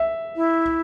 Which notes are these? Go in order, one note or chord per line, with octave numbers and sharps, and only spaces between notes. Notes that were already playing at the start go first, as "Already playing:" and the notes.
Already playing: E5
E4